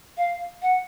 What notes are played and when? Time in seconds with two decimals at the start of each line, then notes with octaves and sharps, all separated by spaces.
0.17 F5
0.62 F#5